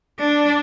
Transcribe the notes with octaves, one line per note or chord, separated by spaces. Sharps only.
D4